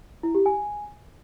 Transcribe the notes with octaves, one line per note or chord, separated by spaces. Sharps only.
E4
G4
G#5